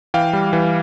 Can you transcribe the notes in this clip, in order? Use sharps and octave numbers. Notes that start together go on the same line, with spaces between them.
E3 F5 G5
G3
E3